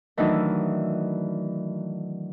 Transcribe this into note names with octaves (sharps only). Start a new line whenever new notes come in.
D#3 E3 F#3 A3 D4 D#4